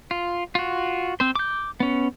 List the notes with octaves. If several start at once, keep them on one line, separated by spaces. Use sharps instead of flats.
F4
F4 F#4
C4 C5
D6 G6
B3 C#4